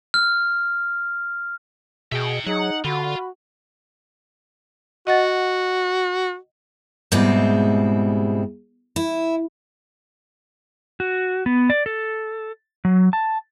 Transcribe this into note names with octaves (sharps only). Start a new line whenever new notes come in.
F6
B2 G#4 E5 G5
F#3 D#4 G#4 F#5
D3 F4 F#4 B5
F#4 D#5 F#5 A6
G#2 B2 G3 G#3 C4 E4
E4
F#4
B3
D5
A4
F#3
A5